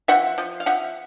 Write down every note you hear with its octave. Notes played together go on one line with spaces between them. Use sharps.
F3 E5 F#5
F3
F5
F3 E5 F#5